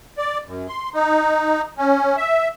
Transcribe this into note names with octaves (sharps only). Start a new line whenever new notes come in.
D5
F#2
C6
D#4
C#4
E5